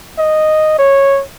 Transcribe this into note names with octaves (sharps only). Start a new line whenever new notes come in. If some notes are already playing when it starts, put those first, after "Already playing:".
D#5
C#5